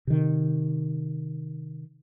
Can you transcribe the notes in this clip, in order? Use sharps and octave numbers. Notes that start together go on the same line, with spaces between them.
C3 D#3